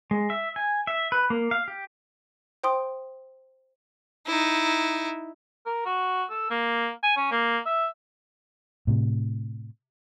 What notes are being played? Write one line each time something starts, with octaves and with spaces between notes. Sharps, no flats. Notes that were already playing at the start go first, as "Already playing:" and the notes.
G#3
E5
G#5
E5
B4
A#3
F5
G4
C5 G5 C6 D#6
D#4 E4
A#4
F#4
A4
A#3
G#5
C#4
A#3
E5
A2 C3